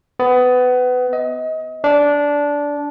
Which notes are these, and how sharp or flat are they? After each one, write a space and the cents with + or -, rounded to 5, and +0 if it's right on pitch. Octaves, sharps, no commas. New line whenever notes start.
B3 +25
D#5 +30
D4 -15